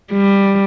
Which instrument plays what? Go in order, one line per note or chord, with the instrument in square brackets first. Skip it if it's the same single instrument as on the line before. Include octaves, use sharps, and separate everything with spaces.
[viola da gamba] G3